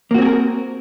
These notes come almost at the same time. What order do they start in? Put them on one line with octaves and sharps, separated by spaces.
A#3 F#4 C4 G#4 A#4